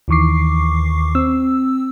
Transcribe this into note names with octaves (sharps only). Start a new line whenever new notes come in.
D#2 D#3 E3 C#6 D6 C7
C4 E6